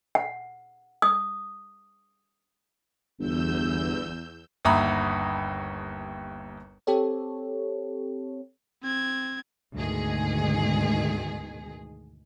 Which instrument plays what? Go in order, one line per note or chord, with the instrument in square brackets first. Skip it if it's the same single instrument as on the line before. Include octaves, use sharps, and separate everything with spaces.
[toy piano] F#5
D#6
[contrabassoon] G1 [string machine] E2 E6 G6
[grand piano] G1 D#2 E5 A#5 B5 D#6
[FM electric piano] C4 G4 A4 C#5
[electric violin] C4 G#6
[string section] D2 G#2 B2 D#3 G#4